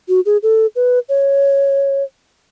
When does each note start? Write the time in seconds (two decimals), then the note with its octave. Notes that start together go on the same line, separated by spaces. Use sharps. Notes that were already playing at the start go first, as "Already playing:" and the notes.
0.09 F#4
0.26 G#4
0.43 A4
0.76 B4
1.09 C#5